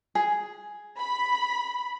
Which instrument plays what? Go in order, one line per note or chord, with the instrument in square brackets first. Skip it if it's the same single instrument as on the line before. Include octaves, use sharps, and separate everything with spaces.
[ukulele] G#4
[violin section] B5